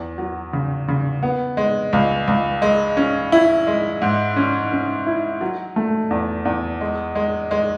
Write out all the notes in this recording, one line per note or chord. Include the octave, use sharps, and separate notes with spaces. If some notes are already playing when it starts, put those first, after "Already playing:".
Already playing: E2
F#3
C#3
C#3
B3
G#3
C#2
C#2
G#3
C#4
E4
G#3
G#2
C#4
C#4
E4
F#3
A3
E2
E2
G#3
G#3
G#3